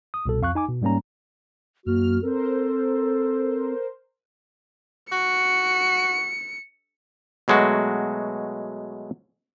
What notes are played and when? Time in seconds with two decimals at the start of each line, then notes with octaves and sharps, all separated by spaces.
0.14 D#6
0.26 C2 B2 A4
0.42 F2 F5 C#6 F#6
0.55 D#4 G#5 D6
0.68 B2
0.82 G#2 G3 A#3 C#4 A#5
1.86 F#2 A#3 F#4 F6
2.23 C4 A4 A#4 C5
5.12 F#4 C#7
7.48 B2 F#3 G#3 A3 F#4